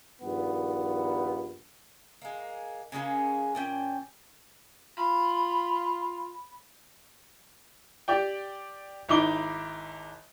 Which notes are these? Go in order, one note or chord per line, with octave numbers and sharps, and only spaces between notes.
A#1 G2 D#3 B3
G#3 A#3
C#3 G#3 A#3 C#4
A#2 C#4 G5
F4 B5
G4 D5 G5
G#1 D#4 E4 D6 G7